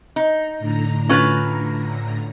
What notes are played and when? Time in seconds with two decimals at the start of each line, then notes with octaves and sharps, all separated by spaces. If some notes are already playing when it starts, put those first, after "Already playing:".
0.16 D#4
0.59 A2 D3 A#5
1.09 C#4 F4 B4